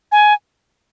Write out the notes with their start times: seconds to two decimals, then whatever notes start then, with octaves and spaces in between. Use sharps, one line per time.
0.12 G#5